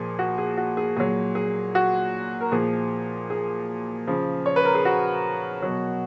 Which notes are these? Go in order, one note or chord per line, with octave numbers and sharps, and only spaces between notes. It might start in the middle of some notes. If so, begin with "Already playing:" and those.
Already playing: A#2 F3 G#4
F#4
G#4
F#4
G#4
A#2 F#3 G#4
G#4
F#4
A#4
A#2 F3 G#4
G#4
C#3 F3
C#5
B4
A#4
G#4
F#4
B2 F#3